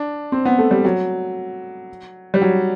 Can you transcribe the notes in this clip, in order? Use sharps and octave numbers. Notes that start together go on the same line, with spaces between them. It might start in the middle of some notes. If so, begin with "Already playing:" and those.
Already playing: D4
C4
B3
A3
G3
F#3
G3
F#3